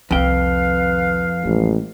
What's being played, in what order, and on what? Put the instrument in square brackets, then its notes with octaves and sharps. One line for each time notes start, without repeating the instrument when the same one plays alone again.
[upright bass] C2 D#3 [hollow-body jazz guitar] F2 G5 [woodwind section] B4 F5
[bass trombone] A1 [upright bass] G#3